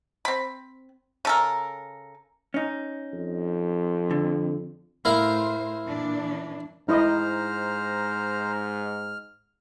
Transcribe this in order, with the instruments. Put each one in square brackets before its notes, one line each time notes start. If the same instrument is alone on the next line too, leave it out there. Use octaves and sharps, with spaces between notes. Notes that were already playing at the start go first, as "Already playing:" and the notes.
[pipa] C4 B5
C#3 A4 A#4
[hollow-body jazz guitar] C#4 D#4
[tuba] F2
[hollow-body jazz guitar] D3
[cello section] A2 C5 [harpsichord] E4 A#4 F5
[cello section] A#2 E3 D4
[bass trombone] G#2 [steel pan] D#4 E4 D#5 [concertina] C5 A#5 [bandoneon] F6